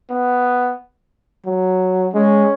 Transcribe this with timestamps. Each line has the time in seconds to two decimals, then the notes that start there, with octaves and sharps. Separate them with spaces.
0.11 B3
1.46 F#3
2.13 G#3 C#4